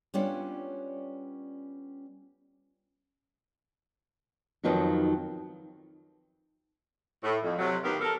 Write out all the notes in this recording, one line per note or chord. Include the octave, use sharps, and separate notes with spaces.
G3 B3 C#4 D4 F4 C#5
F2 D#3 F3 F#3 B3 D#4
A2
F2
C3 F#3 A3
A2 D#3 B3 G4 A#4 F5
A4 A#4